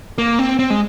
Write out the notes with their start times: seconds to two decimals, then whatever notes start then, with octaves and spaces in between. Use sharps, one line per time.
0.18 A#3
0.39 C4
0.59 C4
0.70 G#3